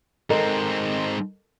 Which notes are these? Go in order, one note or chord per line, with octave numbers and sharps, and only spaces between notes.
G#2 C4 A4 A#4 D#5